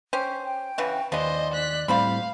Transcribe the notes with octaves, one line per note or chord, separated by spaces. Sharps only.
C#4 G4 C5
G5
C#3 E3 F#4
D#2 F3 G#3 B4 C5 D5 D#5
F#6 B6
A2 F3 G3 C4 C5 F5 B5